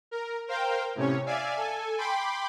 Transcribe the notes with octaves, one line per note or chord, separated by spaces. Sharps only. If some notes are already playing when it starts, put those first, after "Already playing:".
A#4
A#4 C5 F5 G5
A2 C3 C#4 C#5
D5 E5 F5 G#5
A4 G#5
G5 B5 C6 D6